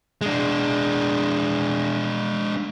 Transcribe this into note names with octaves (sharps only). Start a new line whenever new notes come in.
G#3 D4